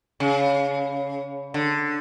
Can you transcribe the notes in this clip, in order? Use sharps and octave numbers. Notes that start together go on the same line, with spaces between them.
C#3
D3